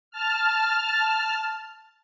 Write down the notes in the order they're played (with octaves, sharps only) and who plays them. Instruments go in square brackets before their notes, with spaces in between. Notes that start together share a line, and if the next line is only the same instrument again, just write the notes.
[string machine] A5 F6